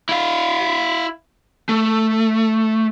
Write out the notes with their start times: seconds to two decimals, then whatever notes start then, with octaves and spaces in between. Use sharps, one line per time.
0.09 E4 F5
1.69 A3